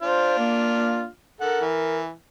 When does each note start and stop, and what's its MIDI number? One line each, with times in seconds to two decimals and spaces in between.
0.02 1.08 62
0.02 1.08 65
0.02 0.35 72
0.02 1.08 89
0.38 1.06 58
1.41 1.61 69
1.41 2.01 70
1.41 1.61 78
1.61 2.13 52